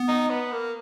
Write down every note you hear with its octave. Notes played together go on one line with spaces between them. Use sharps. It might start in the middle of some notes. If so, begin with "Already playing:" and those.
Already playing: B3
D#4
B3
A#3